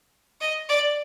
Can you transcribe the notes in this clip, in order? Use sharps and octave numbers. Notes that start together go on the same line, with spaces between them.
D#5
D5